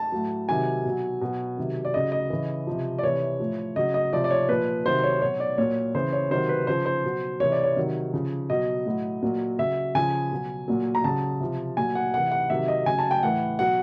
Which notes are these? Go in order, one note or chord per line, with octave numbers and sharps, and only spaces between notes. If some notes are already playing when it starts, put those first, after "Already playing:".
Already playing: A5
A2 F#3
C3 D#3 F#3 G#5
B2 F#3
B2 F#3
C3 D#3 F#3
D5
C#3 F#3 D#5
D#5
C#3 E3
C3 F3
D5
C3 E3 C#5
A2 F3
C#3 F#3 D#5
D#5
C3 F3 D5
D5
C#5
A#2 F3 B4
C3 D#3 F#3 C5
C#5
B2 F#3 C#5
D5
A#2 F#3 C#5
C#3 E3 C5
C#5
C3 D#3 F#3 C5
B4
C#3 F3 C5
C5
B2 F#3
C3 E3 C#5
D5
C#5
C3 D#3 F#3
C#3 F3
B2 F#3 D#5
A2 F#3
A#2 F#3
C#3 F#3 E5
C#3 F3 G#5
B2 F#3
A#2 F#3
A#5
C#3 F#3 A5
C3 F3
A#2 F#3 G#5
F#5
C3 E3 F#5
F#5
C3 D#3 F#3 E5
D#5
C#3 F#3 G#5
A5
G5
A2 E3 F#5
B2 F#3 F#5